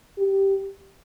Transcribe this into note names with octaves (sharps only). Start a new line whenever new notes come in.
G4